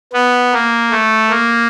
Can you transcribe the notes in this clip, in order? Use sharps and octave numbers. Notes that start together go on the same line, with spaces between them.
B3
A#3
A3
A#3